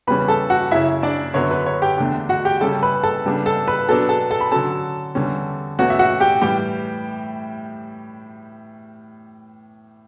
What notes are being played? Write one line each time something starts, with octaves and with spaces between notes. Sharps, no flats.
E2 C#3 G3 C#4 B4 B5
A4 A5
F#4 F#5
F#2 C#3 F#3 C#4 E4 E5
D4 D5
F#2 D3 F#3 B3 C#5
B4
C#5
G4 G5
E2 D3 A3 D4
F#4 F#5
G4 G5
C#3 G3 C#4 A4 A5
B4 B5
A4 A5
C#3 G3 B3 D4
A4 A5
B4 B5
B2 F#3 B3 D4 A4 A5
A4 A5
A4 A5
B5
D3 F#3 C#4 A4 A5
E2 D3 G3 C#4
E2 B2 A3 C#4 F#4 F#5
E5
F#4 F#5
G4 G5
A2 E3 G3 G4 G5